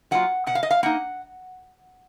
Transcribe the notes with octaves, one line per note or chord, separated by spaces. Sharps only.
F#3 A#3 F4 F#5
B2 F#5
F5
D#5
F5
A#3 D#4 F#5